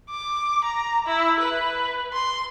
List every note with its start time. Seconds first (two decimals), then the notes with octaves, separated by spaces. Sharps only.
0.10 D6
0.64 A#5
1.06 E4
1.41 B4
2.13 C6